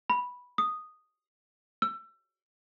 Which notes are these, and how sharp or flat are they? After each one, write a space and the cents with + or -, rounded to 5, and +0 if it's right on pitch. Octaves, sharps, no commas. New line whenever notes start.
B5 -5
D#6 -5
E6 +30